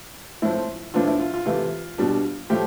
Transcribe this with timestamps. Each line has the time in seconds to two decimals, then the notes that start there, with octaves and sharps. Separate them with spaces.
0.42 A2 F3 A3 C4 E4
0.94 A2 F3 B3 D4 F4
1.07 E4
1.20 F4
1.34 F4
1.46 C3 E3 A3 F4
1.98 B2 G3 D4
2.50 A2 F3 A3 G4